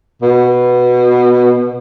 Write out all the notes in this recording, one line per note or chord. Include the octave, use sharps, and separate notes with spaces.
B2